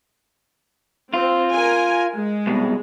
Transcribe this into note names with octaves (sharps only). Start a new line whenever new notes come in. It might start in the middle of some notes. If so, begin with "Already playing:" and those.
C4 F4
A#4 G#5
G#3
C2 B2